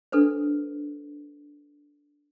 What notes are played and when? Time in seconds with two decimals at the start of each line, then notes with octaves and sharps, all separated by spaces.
0.12 D4 A4 B4 C5